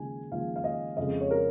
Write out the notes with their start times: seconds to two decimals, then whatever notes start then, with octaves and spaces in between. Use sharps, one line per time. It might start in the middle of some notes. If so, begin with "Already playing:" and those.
Already playing: D#2 C#3 F3 G#3 G#5
0.31 D#2 C#3 F3 G#3 F5
0.56 F5
0.64 D#5
0.97 F2 C#3 G#3 D#5
1.21 C#5
1.31 A#4